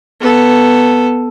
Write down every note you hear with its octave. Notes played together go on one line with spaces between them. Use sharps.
B3 A4